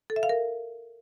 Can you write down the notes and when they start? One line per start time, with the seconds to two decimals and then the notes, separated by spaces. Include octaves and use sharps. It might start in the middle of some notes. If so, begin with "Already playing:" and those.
0.10 A4
0.16 E5
0.23 F5
0.29 A#4